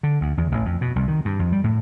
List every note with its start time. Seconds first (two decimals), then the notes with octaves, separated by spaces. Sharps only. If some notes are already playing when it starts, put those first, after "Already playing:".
0.03 D3
0.21 D2
0.37 E2
0.52 A1
0.65 F2
0.81 B2
0.96 C2
1.08 D#3
1.25 G2
1.39 F2
1.52 G3
1.64 A2